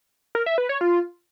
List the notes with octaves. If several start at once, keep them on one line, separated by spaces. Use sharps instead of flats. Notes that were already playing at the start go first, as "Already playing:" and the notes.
A#4
E5
B4
C#5
F4